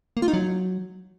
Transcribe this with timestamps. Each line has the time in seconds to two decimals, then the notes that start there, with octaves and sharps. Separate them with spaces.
0.17 A#3
0.22 F4
0.28 D#4
0.34 F#3